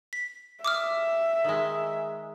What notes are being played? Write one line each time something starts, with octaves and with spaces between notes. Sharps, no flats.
B6
E5 D6 D#6 F6
D#3 G#3